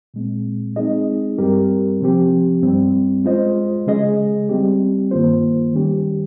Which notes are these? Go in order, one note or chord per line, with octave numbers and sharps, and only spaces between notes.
A#2 G#3 C4
G#3 C4 D#4 G#4 D#5
G2 G3 C4 G4 A#4
C3 F3 C4 G4
G2 G3 C4
G#3 C#4 F4 C5 D#5
C#3 G#3 C#4 G#4 D#5
G3 C4 G4
G2 D#3 A#3 F4 C5
D#3 G3 C#4 G4